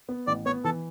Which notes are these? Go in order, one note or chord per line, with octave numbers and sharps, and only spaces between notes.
B3
A1 D5
B3 C#5
E3 A4